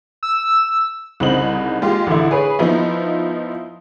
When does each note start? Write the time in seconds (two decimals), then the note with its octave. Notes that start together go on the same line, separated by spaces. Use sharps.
0.23 E6
1.20 C2 C#3 C4 D#4 F#7
1.82 G#3 F4 G4
2.07 A1 D3 E4
2.31 G#4 B4 C#5
2.59 F3 B3 D#4 E4